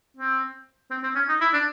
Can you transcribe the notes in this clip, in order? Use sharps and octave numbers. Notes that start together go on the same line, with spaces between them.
C4
C4
C4
C#4
D#4
E4
D4